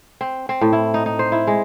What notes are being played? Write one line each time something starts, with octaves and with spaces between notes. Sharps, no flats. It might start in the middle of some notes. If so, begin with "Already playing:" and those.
C4
C4
A2
E4
D#4
D#4
C5
E4
G#3